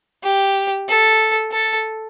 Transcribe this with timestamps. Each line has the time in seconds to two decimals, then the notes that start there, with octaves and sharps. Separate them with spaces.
0.24 G4
0.88 A4
1.52 A4